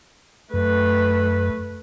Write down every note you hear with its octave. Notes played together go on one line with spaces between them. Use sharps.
F#2 A3 B4